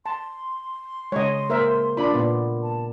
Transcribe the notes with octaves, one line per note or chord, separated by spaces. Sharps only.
A5 C6
C#3 G#3 C#5 D#5
A#3 A#4 C5 E5
D4 F4 D5 B5
A#2 B3
A5